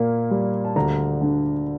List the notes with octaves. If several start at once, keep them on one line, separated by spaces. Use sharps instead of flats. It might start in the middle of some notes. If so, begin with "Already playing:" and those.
Already playing: A#2 A#3
G3
A5
D2 A#5
D3